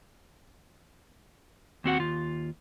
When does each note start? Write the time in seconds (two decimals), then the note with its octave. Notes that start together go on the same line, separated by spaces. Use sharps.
1.84 D#2 C4 F#4 F#5
1.99 D#2 F4